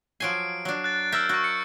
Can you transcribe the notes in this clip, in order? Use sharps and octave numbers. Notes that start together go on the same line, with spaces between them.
F3 F#3 G#5 C7 D7
F#3 D4
F#6 A6
A#4 E5 E6 G6
F#4 C#6 E6
C#7